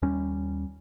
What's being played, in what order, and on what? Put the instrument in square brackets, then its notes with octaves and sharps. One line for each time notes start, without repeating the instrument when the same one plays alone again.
[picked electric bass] D#2 G3 C#4